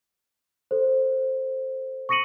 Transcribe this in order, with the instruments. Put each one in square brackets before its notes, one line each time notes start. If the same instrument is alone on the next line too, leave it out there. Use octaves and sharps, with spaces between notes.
[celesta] A4 C5
C#6 D#6 A#6 C#7 D#7 F#7